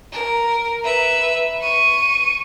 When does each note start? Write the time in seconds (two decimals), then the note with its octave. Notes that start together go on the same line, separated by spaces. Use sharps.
0.12 A#4
0.84 B4 E5
1.62 C#6 D#7